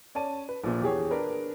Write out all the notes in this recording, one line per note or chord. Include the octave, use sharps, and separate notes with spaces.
C#4 D5 A5 D#7
B4
A#1 A#2
E2 G4 G#4 C#5
D4 A#4 B4